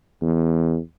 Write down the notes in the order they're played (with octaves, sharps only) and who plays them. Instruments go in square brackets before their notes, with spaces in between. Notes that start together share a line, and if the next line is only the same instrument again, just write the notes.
[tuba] E2